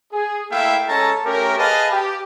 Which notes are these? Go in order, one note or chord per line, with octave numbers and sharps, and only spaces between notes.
G#4
A3 A#3 E4 E5 F5 G5
G#3 C#4 A4 C#5 A5 A#5
A3 C#4 G4 A#4
G#4 B4 D#5 F5 A5
G4